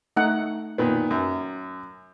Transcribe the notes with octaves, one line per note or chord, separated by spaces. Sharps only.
A3 D#4 F#5
A#2 D#3 B3
F#2